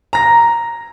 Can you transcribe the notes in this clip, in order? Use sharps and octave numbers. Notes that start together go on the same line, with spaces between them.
A#5 A#6